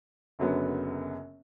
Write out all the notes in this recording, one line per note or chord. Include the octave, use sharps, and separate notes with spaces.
F#1 F#2 D3 F#3 B3